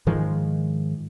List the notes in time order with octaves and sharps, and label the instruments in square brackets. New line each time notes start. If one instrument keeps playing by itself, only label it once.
[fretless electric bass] G#2 D#3 F3 G#3